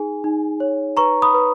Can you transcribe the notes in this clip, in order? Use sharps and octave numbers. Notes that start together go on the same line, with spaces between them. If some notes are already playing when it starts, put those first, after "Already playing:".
Already playing: D#4 G#4 G#5
D#4
C#5
B4 A#5 C#6
B5 D#6
B4